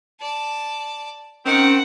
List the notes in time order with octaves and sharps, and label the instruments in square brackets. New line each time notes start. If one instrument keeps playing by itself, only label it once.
[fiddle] D5 A5
[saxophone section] D#3 C4 [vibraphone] C#4 [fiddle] F#5